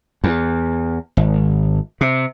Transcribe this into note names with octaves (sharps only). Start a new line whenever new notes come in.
E2
G#1
C3